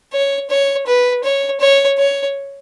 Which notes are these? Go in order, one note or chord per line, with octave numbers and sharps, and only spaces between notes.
C#5
C#5
B4
C#5
C#5
C#5